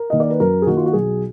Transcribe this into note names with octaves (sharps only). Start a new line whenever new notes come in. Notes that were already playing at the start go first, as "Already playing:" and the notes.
Already playing: A#4
D#3 A#3 D#5
D5
B4
F#2 A#4
G#4
D#3 A#3 F#4
F4
F#4
B1 G#4